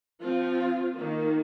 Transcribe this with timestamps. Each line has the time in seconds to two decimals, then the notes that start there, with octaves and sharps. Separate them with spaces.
0.19 F3 C4 F4
0.93 D#3 A#3